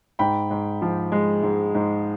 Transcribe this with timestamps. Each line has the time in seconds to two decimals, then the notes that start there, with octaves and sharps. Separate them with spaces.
0.19 G#2 G5 B5
0.50 G#2
0.82 F3
1.12 G#3
1.43 G#2
1.74 G#2